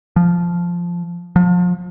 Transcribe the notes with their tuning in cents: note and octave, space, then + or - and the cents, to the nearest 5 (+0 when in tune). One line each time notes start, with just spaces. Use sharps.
F3 -5
F3 +30